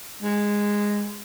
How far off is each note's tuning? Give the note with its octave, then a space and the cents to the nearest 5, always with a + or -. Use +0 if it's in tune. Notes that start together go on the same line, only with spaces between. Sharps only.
G#3 -10